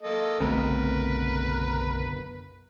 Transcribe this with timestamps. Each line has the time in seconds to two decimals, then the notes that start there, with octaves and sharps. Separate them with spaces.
0.02 A#3 A4 D#5
0.40 F#1 B1 D3 A3 B3 C4 A#4 B4